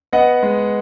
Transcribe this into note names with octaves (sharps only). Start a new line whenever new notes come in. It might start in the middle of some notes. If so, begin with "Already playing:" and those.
B3 D#5 F#5
G#3